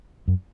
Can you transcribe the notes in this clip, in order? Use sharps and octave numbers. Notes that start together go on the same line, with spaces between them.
F#2